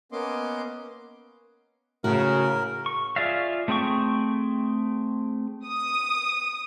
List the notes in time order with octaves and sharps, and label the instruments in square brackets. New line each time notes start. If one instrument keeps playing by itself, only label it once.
[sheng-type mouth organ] A#3 B3 C#4 D#5 C6 D6
[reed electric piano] A2 [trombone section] C#3 [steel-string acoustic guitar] F#4 [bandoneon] A#4
[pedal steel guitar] C#6
F4 G#4 D5 E5 F5
A3 C4 G#4 G5 C#6
[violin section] D#6